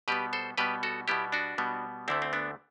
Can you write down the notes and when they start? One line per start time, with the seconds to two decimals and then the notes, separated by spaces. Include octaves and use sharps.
0.08 B2 G3 B3 G4 B4
0.33 A4 C5
0.58 B2 G3 B3 G4 B4
0.83 F#4 A4
1.08 B2 G3 B3 E4 G4
1.32 D4 F#4
1.58 B2 G3 B3
2.08 D2 D3 A3 C4 E4
2.22 C4
2.33 B3 D4